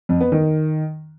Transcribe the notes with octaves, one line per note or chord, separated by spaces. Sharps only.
F2
B3
D#3